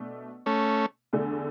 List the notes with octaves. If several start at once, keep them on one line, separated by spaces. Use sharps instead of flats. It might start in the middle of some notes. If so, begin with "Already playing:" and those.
Already playing: B2 A3 D4
A3 C#4
E2 D3 A3 D4